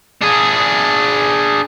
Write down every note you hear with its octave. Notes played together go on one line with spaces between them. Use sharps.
D4 G#4